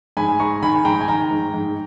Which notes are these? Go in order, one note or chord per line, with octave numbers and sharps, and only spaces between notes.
G#2 G#5 B5
G#2 A#5 C#6
D#3 G#5 B5
G#2 G5 A#5
G#5
D#3 G5 A#5
G#2
G#2